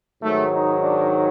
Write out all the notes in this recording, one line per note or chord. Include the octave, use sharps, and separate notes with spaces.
G#2 D#3 F#3 A3
D#4
D4